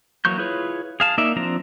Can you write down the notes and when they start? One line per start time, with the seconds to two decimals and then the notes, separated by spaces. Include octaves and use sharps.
0.25 E3 F#3 A#3 C#6 G6
0.38 E4 F4 G#4 B4 C#5
1.00 G#4 F5 A5
1.18 A#3 D#4 D5 E5
1.36 F3 C4 D4 A#5